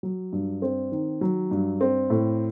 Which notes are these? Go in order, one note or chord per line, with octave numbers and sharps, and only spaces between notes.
F#3
G2
C4
D#3
F#3
G2
C4
A2